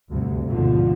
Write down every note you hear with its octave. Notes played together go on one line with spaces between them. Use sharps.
D2 G2 C3
G#1 G#2 B2 D3 F3